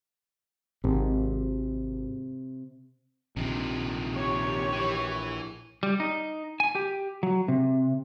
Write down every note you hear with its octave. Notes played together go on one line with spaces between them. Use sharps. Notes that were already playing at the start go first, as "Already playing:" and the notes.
G#1 C3
A#1 C3 D#3
G4 C#5
E3
G3
D#4
G#5
G4
F#3
C3